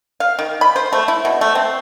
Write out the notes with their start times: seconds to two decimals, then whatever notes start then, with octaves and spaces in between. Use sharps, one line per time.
0.20 F5
0.39 D#3
0.61 B5
0.76 C5
0.93 A3
1.08 E4
1.25 B2
1.41 A3
1.55 C4